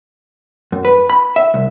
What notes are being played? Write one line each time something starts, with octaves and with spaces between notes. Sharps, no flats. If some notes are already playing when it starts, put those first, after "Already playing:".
F#2
B4
B5
E5
C2